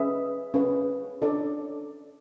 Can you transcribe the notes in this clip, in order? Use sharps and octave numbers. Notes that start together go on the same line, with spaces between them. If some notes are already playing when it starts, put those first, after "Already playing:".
Already playing: C#4 G#4 B4 E5
C#4 G#4 B4
D4 A4 C#5 D5